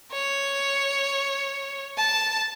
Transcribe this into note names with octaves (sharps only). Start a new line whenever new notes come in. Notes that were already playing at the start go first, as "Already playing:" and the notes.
C#5
A5